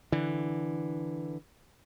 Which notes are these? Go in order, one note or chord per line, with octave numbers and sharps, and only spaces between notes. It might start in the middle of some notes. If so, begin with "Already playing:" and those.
D3 E3